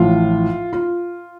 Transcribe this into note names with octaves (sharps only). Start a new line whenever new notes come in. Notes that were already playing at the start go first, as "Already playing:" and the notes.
Already playing: A1 A2 F3 F4
F4